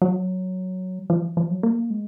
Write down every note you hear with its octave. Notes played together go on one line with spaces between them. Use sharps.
F#3
F3
F3
F#3
A#3
G#3